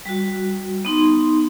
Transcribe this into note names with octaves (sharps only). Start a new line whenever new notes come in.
G3 F#4
B3 D#4 C6